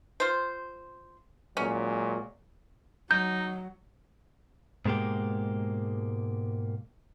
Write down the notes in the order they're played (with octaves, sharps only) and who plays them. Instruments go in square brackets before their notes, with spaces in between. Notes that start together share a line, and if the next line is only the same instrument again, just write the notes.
[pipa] F4 C5
[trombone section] A#2 F#3 G#3 [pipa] C#4
[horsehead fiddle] F#3 [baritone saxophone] D#4 [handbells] G6
[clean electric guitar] G#2 B2 G#3 A#3 G4